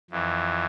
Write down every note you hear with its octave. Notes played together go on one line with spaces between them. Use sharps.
F2 E3